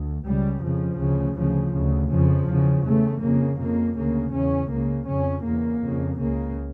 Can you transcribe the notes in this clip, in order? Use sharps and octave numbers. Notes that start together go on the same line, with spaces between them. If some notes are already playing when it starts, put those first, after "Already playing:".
Already playing: D2
C#2 C#3 G3
F2 C#3 F3
D2 C#3
D2 C#3 F3
D2 C#3
F2 C#3 F3
E2 C#3
E2 C#3 A3
F2 C#3 A#3
F2 C#3 A#3
D2 C#3 A#3
E2 C#3 C#4
C#2 C#3 A#3
F2 C#3 C#4
E2 C#3 A#3
F2 C#3
C#2 C#3 A#3